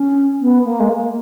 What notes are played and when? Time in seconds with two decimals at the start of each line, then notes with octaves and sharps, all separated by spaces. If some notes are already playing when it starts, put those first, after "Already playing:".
Already playing: C#4
0.41 B3
0.65 A#3
0.80 G#3
0.89 A#3